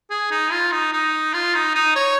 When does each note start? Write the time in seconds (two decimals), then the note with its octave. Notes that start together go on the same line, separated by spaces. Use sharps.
0.10 G#4
0.31 D#4
0.51 F4
0.72 D#4
0.93 D#4
1.34 F4
1.55 D#4
1.75 D#4
1.96 C#5